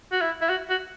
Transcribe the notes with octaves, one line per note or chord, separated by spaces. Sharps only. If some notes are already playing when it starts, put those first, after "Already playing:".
F#4
E4
E4
F#4
F#4